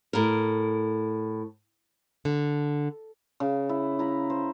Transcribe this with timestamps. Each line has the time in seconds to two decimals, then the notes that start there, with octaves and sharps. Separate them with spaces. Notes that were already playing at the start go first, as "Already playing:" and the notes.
0.13 A2 A#4
2.25 D3
3.40 C#3
3.69 E4
3.99 E4 A#5 B5
4.30 C5